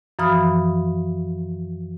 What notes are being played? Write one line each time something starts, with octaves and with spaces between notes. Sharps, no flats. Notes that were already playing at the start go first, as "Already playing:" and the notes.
F#2 E3 F3 B5 D#6 F6